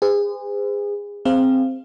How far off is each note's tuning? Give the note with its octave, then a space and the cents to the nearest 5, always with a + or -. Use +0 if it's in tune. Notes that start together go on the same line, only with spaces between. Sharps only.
G#4 -30 C5 -45
C4 +0 G#4 +0 F5 -15